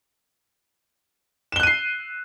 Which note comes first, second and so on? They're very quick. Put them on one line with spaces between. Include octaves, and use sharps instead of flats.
E7 G7 F#6 D#7 C7